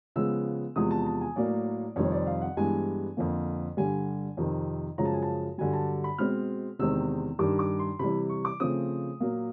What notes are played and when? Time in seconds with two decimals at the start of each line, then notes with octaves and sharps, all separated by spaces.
0.16 C#3 F3 G#3 B3 E6
0.76 E2 C3 F3 G#3 D#6
0.91 A5
1.06 A5
1.21 G#5
1.36 A2 F#3 A#3 D5
1.96 F2 C3 D#3 G3 C4 C#5
2.11 D5
2.27 F5
2.41 F#5
2.57 G2 E3 G#3 B3 G#5
3.17 F2 D3 F3 A#3
3.77 G2 D3 G3 G#5
4.37 F2 C3 D#3
4.98 F#2 C#3 F3 G#3 A#5
5.05 A5
5.13 G#5
5.22 A5
5.58 G2 D3 F#3 G#5
5.73 A5
6.04 B5
6.18 B2 G#3 C4 F6
6.79 E2 C3 D#3 G#3 C4 E6
7.39 G2 D#3 G3 D6
7.59 D6
7.79 C6
7.99 C3 E3 G3 B5
8.29 C#6
8.45 D6
8.60 C#3 F3 A3 C4 D#6
9.20 A#2 F#3 A#3